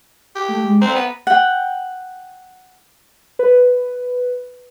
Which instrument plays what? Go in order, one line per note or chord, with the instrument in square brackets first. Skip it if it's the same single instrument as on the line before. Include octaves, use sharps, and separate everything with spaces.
[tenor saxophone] G4
[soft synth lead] A3
G#3
[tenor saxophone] C4 [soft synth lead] A#5
[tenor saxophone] B3
[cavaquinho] F#5 G5
[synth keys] B4